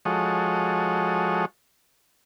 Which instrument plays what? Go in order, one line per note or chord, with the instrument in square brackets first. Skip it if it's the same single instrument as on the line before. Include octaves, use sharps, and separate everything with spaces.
[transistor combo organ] F3 G#3 F#4 A4 C#5 D#5